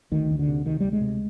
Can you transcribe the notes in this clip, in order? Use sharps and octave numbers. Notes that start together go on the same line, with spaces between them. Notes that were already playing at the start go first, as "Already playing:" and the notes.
D2 D#3
D2
D3
C3
C3 D#3
D2 G3
G#3
C3